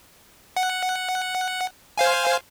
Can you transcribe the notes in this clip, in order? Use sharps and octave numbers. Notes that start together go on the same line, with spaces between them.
F#5
C5 F5 G#5